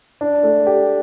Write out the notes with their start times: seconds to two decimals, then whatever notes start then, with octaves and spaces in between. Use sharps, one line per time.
0.21 D4
0.43 A3
0.66 G4